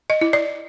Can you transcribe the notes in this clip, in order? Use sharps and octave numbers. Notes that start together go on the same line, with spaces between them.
D#5
E4
D5